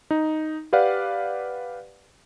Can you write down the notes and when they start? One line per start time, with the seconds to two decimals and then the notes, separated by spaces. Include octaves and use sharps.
0.11 D#4
0.73 G4 B4 D5 F5 F#5